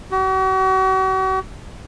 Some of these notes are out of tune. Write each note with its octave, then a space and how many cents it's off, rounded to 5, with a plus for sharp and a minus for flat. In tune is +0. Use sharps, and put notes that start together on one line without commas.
F#4 +40